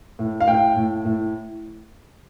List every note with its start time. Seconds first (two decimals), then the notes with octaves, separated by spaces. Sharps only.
0.19 A2
0.41 F5
0.47 A2 G5
0.76 A2
1.05 A2